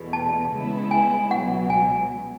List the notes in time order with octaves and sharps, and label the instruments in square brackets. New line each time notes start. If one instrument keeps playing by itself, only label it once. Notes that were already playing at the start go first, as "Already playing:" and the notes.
Already playing: [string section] E2 B2 A3
[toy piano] A5
[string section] C#3 G#3 B3 E4
[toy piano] G#5
[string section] C#2 B2 F#3 [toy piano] F#5
[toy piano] G#5